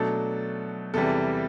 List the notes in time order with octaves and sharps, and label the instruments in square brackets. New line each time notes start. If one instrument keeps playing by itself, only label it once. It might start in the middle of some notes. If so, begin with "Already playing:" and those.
Already playing: [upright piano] B2 F#3 A3 D4 A4
E2 C3 E3 G3 A4